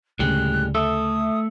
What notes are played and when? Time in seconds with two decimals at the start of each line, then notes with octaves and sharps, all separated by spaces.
0.19 D2 A2 C#3 G3 G#3 F#6
0.75 A3 A4 E5 D#6